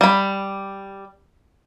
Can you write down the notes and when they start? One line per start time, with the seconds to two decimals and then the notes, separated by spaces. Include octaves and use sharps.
0.01 G3 B5